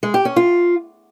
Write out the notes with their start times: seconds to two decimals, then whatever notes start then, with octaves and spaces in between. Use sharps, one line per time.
0.03 G#3
0.14 G4
0.25 C#4
0.36 F4